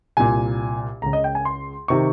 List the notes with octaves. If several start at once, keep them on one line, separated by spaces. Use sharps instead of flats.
C2 A#2 G#5
C#2 C#3 A#5
D#5
G5
G#5
C6
C3 D#3 C#6